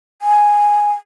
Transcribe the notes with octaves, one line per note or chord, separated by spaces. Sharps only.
G#5